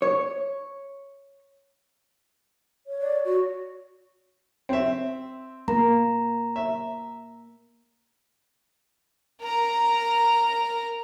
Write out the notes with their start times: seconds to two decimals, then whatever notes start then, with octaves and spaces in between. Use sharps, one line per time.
0.02 C#5
2.87 C#5
3.01 D5
3.25 F#4
4.69 C4 E5
5.68 A#3 A#5
6.56 E5
9.42 A#4 A#5